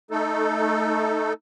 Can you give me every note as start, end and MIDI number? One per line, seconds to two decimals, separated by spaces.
0.11 1.33 57
0.11 1.33 63
0.11 1.33 69